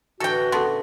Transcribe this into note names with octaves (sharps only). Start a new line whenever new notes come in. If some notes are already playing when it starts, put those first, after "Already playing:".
A2 D3 E3 F#4 A4 G5
C#3 B3 A4 A5 C6